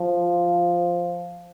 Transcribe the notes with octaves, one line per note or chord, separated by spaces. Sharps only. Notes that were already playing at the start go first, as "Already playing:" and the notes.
Already playing: F3